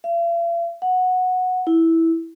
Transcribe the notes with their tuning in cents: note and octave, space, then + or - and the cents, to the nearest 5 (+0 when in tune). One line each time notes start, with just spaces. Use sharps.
F5 -45
F#5 -10
E4 -10